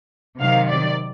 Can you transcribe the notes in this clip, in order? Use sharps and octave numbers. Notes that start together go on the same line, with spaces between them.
C3 D#3 F#3 F5
D5